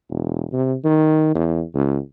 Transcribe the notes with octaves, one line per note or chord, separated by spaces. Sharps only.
E1
C3
D#3
E2
C#2